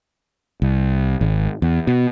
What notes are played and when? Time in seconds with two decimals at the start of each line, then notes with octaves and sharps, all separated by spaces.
0.62 C2
1.21 G#1
1.62 E2
1.87 B2